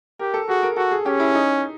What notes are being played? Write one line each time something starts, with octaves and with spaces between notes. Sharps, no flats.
G4 A#4
A4
F#4 G#4
A#4
F#4 A4
G#4
C#4 G4
E4
D#4